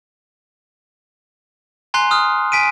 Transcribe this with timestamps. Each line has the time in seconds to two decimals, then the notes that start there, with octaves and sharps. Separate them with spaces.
1.94 G#5 A#5 C6 F#6 C7
2.11 D#6 F6
2.52 G#5 B6 D7 D#7